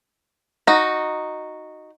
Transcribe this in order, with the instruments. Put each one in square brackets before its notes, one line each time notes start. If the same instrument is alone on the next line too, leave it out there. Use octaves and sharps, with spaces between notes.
[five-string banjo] D#4 F#4